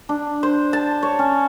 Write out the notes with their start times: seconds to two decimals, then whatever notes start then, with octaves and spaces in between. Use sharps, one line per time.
0.09 D4
0.43 C5
0.73 A5
1.03 C#5
1.19 C#4